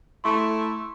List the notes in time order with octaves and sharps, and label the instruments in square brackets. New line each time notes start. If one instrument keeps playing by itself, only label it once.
[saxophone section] A3 E4 [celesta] C6 C#6